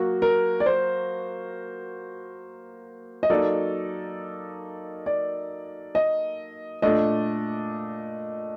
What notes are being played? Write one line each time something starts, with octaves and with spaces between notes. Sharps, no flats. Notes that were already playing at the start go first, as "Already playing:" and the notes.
Already playing: F#3 A#3 F#4
A#4
D5
C5
D#5
F#3 A#3 D#4 A4 D5
D5
D#5
A#2 A3 D4 A4 D5 D#5